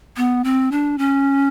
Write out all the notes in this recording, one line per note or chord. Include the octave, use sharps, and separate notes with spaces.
B3
C4
D4
C#4